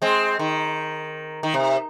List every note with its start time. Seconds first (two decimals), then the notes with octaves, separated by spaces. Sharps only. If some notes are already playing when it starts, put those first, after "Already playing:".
0.02 G#3 C4
0.39 D#3
1.43 D#3
1.54 C3